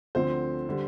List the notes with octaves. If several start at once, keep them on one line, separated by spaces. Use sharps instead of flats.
D2 D3 F3 C4 C5
D3 G3